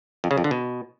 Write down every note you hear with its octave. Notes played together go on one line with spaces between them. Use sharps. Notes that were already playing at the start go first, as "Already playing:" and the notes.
F2
C#3
F2
D3
B2